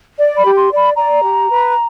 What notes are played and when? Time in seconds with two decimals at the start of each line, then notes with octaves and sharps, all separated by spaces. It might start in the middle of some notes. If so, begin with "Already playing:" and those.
0.17 D5
0.37 B5
0.44 G4
0.57 C6
0.71 D5
0.76 B5
0.96 D5 A#5
1.23 G4
1.49 B4